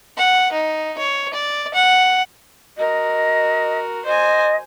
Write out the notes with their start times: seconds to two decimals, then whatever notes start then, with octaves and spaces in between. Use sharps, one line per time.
0.17 F#5
0.52 D#4
0.98 C#5
1.33 D5
1.74 F#5
2.78 F#4 A#4 D#5
4.05 C5 D#5 G#5